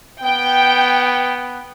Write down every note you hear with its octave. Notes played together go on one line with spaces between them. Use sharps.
B3 G5